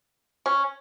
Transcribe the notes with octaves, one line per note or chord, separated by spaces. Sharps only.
C#4